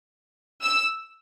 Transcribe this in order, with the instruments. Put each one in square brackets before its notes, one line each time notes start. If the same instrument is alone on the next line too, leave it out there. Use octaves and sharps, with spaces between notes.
[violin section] E6